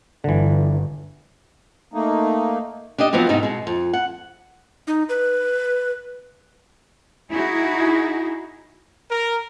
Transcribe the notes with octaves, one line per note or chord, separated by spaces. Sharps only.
G1 D3 E3
A3 A#3 D#4
D4 D#4 G4 D#5
F3 F#3 B3 C4 F#4
G#2 C3 B3 D#4
B2 G#3
F2
F#5
D#4
B4
D#4 E4 F#4 G#4
A#4